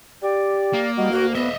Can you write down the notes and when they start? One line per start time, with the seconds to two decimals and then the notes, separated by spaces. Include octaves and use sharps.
0.22 G4 D5
0.74 A#3
0.97 G3 F#4 D#5
1.11 D2 F#4
1.35 B3 D#5 E5